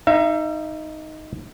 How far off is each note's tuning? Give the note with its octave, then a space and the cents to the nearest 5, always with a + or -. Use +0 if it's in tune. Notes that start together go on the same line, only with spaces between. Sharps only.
D#4 +0 E5 +40